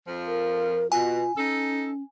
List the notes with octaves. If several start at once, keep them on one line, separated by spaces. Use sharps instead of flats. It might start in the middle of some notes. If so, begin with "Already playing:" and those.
F2 F3
A#4
B2 F4 G#5
C#4 D#4 A4